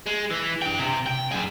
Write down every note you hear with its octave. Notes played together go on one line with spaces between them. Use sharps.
G#3
E3
D4 G5
C3
G5
F#2 G#4